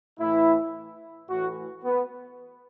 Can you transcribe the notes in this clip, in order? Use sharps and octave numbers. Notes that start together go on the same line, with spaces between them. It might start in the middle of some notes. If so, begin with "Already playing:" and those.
A2 E3 E4
A2 E3 F#4
B3